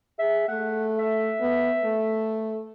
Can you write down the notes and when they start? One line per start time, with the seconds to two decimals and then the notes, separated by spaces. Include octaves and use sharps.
0.19 G#4 E5
0.49 A3 F#5
0.99 E5
1.40 B3
1.84 A3